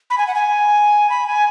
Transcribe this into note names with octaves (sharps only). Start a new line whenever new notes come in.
B5
G#5
F#5
G#5
B5
G#5